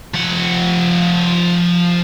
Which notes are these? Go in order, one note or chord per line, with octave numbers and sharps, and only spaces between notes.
F3 F#5